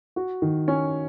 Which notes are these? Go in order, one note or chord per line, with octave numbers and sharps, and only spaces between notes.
F#4
D#3
C#4